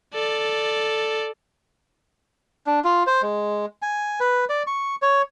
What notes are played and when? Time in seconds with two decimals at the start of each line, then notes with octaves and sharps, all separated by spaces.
0.14 A4 D5
2.67 D4
2.84 F4
3.07 C5
3.22 G#3
3.82 G#5
4.20 B4
4.49 D5
4.67 C#6
5.02 C#5